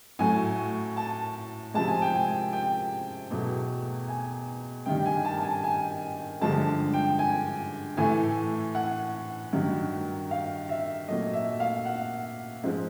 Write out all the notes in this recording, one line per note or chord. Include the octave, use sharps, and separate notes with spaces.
A2 F#3 A3 G#5
A5
C3 F3 G#3 A5
G#5
G5
G#5
G5
E2 B2 F#3 A3
G#5
G2 D#3 G3 G5
G#5
A5
A5
G#5
G#5
G2 D3 F3 G#3 A5
G5
G#5
A2 E3 A3 G#5
F#5
G2 D#3 F#3
F5
E5
A#2 F#3 A3 D#5
E5
F5
F#5
G#2 F3 G#3